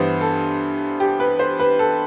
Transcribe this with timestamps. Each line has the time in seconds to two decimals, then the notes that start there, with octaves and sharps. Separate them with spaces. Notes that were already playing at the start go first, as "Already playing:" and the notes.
Already playing: G2 E3 B3 C5
0.21 A4
1.00 G4
1.20 B4
1.39 C5
1.59 B4
1.79 A4